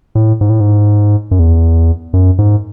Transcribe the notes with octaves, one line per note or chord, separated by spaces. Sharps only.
A2
G#2
A2
G#2
F#2
E2
F#2
G#2